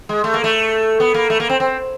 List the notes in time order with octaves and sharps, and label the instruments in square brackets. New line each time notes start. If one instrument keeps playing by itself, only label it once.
[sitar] G#3
A3
A#3
A3
B3
A#3
A3
A#3
C4
C4